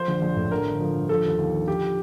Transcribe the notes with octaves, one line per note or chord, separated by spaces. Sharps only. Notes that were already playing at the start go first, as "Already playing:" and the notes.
Already playing: F3 C5
A#1
A#1
A2
D3 A#4
G1
F3
G2
F3 A4
D#2
D#2
D3
F3 G4